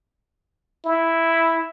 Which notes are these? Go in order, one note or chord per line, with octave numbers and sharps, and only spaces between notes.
E4